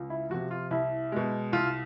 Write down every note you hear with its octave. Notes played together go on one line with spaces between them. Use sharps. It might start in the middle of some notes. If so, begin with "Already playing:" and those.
Already playing: C#2
E4
C3 F3 F#4
F4
C2 E4
B2 G#3
C2 F4